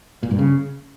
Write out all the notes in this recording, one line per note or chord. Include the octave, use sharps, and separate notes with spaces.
A#2
G2
C#3